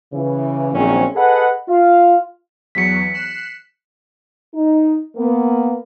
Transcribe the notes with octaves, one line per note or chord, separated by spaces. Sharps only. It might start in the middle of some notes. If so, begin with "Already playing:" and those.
C#3 E3
A#1 D#3 F#3 C4 C#4 G#4
G#4 A4 B4 D#5 F#5
F4 F5
E2 F#3 B6 C#7
F#6 C7 E7
D#4
A#3 B3